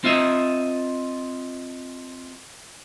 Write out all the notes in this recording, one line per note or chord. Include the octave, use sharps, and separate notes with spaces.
C4 F4 D#5 E5